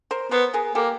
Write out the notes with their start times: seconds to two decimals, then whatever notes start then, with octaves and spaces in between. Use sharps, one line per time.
0.11 A#4 C5
0.31 B3 A#4 C5
0.54 G#4 A#4
0.75 A#3 G4 A4